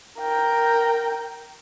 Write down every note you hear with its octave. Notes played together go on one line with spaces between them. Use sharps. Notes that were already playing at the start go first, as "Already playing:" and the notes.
A#4 G5